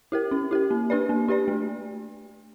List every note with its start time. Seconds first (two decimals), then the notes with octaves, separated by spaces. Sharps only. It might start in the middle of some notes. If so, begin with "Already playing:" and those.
0.12 E4 G4 A#4
0.31 C#4
0.51 E4 G4 A#4
0.71 A#3
0.90 D4 G4 B4 D5
1.09 A#3
1.28 D4 G4 B4 D5
1.48 A3